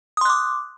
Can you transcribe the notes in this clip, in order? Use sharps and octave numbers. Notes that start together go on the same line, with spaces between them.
C6 D6 D#6 F#6